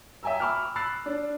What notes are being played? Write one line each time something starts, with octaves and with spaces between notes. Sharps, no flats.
E5 G5 G#5 A#5 E6
B5 C#6 D6 E6 F6
B5 E6 F#6 A6 C7
D4